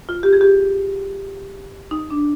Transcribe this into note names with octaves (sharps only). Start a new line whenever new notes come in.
F4
G4
G#4
G4
D#4
D4